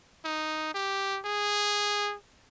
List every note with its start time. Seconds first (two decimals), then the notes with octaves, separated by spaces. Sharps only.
0.25 D#4
0.74 G4
1.25 G#4